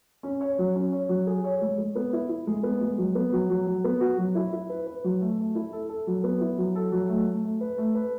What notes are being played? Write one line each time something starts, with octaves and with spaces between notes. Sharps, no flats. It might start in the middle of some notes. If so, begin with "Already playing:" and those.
C#4
C#5
F#3
C#4
C#5
F#3
G#4
C#5
G#3
G#3
B3
E4
E4
G#3
B3
G#3
F#3
B3
F#3
F#3
F#3
B3
F#4
F#3
E4
E4
B4
B4
F#3
A3
A3
E4
A4
A4
F#3
B3
E4
F#3
A4
F#3
A3
A3
A3
B4
A3
B4